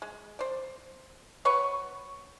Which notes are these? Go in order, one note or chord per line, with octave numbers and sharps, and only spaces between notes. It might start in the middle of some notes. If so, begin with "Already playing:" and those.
G#3
C5 D5
F#3 B4 C#5 C#6